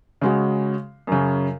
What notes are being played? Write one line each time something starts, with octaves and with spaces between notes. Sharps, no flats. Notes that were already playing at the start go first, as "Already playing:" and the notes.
C#3 G#3 F#4
F#2 C#3